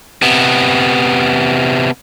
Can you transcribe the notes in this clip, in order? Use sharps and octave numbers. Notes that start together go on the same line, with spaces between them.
C3 B3